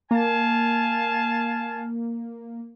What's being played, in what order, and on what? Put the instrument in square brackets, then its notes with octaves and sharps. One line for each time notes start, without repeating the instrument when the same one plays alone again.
[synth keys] A#3 [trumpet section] F5 G#5 A5